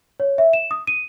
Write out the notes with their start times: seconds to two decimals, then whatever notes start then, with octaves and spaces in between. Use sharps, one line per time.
0.20 C#5
0.38 E5
0.53 E7
0.71 D#6
0.87 D#7